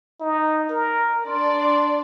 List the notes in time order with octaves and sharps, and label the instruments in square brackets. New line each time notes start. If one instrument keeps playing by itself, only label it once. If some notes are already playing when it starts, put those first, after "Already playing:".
[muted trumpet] D#4
A#4
[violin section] D4 D5 [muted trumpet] C6